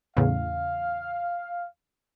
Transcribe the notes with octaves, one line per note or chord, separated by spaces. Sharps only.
E2 A2 C#3 F5